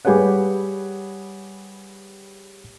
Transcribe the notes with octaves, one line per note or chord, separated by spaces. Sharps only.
G3 G4 G#4 B4 C#5 F#5